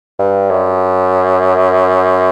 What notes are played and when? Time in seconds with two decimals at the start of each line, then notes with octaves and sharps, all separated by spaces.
0.19 G2
0.50 F#2